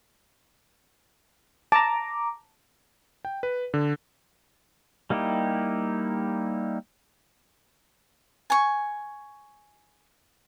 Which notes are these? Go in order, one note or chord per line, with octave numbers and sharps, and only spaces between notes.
A5 A#5 D6
G5
B4
D3
G3 A#3 D#4 E4 G4
G#5 C#6